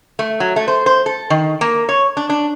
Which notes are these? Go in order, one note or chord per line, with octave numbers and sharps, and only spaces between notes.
A3
F#3
A3
C5
C5
A4
D#3
A#3
C#5
D4
D4